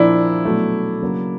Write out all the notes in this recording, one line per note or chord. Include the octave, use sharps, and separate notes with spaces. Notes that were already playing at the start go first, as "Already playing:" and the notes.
Already playing: A#2 F3 A#3 D4 E4
B2 F#3 A3
C#3 F#3 A#3